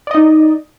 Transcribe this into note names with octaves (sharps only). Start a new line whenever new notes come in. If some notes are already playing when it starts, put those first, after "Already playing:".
D#4 D5 D#5